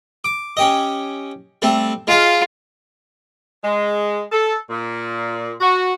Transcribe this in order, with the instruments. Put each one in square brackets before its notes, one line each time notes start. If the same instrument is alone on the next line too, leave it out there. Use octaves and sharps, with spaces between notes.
[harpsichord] D6
C#4 G4 D#5
G3 A3 C4
[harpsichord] G#3 F5 [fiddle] F4
[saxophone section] G#3
A4
A#2
F#4